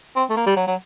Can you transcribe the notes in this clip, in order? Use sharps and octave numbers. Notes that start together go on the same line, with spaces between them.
C4
A3
A#3
G3
F#3
F#3